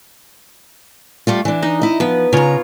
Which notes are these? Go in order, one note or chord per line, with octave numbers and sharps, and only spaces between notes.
G3 A3 F4
E3 D4
D#4
E4 D#5
F3 B3 B4
C#3 F4 C#5 A#5